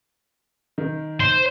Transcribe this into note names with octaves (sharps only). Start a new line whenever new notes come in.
D#3
C5